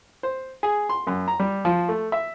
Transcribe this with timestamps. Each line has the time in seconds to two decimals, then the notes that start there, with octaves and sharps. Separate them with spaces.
0.23 C5
0.63 G#4
0.89 C6
1.07 F#2
1.28 A#5
1.40 G3
1.65 F3
1.89 A3
2.12 E5